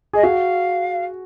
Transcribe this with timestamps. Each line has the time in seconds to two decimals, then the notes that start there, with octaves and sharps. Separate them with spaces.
0.13 G#4 D#5
0.23 F#4 F5